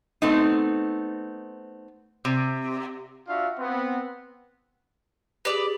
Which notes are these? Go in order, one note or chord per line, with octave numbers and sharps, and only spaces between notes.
A3 B3 C4 D#4
C3
D4 F4 F#4 E5 F5
B3 C4
G4 G#4 B4 D5